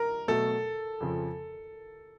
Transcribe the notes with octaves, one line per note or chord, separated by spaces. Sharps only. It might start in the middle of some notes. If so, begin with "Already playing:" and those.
Already playing: A#4
B2 F#3 A3 A4
F2 C#3 F3